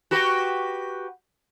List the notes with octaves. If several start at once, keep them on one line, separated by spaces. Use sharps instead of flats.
F#4 G4 B4